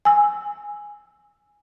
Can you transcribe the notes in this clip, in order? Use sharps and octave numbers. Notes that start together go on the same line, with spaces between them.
G#5 E6